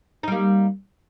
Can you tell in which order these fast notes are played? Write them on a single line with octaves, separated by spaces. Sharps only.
D#4 G3 A#3